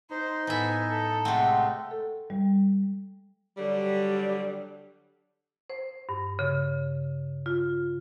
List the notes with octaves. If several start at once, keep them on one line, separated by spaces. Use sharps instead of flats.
D#4 C5
A2 B3 E5 G#5
A4
C3 G#3 A3 C4 F#5
A4
G3
D3 F#3 G3
C5
G2
C#3
F4